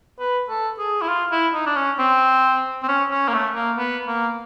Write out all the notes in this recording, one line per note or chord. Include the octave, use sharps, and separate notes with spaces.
B4
A4
G#4
E4
F4
E4
D#4
D4
C#4
C4
C4
C#4
C#4
A#3
A3
A#3
B3
A#3